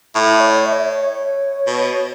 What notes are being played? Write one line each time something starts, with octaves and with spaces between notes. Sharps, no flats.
A2 E5
C#5
E5
C#5
E5
C#5
B2